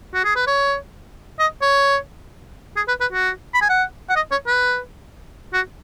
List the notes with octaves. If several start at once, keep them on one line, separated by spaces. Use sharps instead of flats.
F#4
G#4
B4
C#5
D#5
C#5
G#4
B4
B4
F#4
B5
G#5
F#5
F#5
D#5
C#5
B4
F#4